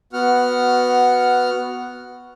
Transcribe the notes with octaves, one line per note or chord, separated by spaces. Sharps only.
B3 F#4 F#5 F6